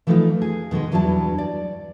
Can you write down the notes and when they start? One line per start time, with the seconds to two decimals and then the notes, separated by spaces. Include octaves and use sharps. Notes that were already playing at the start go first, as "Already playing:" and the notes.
0.07 E3 F3 A3 B3 D#4 F4
0.42 G#4
0.71 B2 D#3 F3 G#3
0.92 E2 G2 F#3 D4 E4 A5
1.38 D5